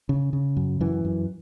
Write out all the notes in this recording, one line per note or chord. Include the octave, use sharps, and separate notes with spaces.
C#3
C#3
F#2
F#2 E3
F#2